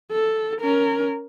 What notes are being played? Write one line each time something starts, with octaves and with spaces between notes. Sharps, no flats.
A4
C#4 A#4